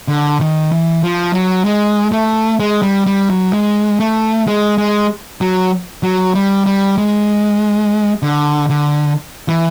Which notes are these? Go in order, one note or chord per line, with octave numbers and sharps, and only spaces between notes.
D3
D#3
E3
F3
F#3
G#3
A3
G#3
G3
G3
F#3
G#3
A3
G#3
G#3
F#3
F#3
G3
G3
G#3
D3
D3
E3